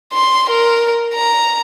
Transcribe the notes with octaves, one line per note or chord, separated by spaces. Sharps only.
C6
A#4
A#5